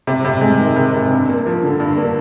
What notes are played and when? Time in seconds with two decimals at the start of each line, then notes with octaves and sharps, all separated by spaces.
0.07 C3
0.25 C3
0.41 G#3
0.59 D#3
0.76 C3
0.93 C3
1.11 G2
1.29 A#3
1.46 F3
1.63 D3
1.80 G2
1.97 A#3